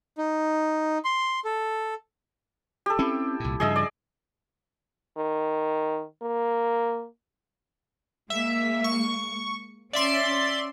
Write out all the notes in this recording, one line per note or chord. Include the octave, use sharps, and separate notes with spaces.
D#4
C6
A4
G4 A4
C4 C#4 E4
C2 A#2
G2 C#3 F3 G#4 D#5 E5
D5
D#3
A#3
G#3 A#3 E5
C#6
C#4 D5 E5 C6